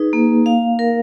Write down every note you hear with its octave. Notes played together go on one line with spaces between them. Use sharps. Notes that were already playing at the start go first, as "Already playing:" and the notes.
Already playing: D#4 G#4 B4
A#3
F5
A#4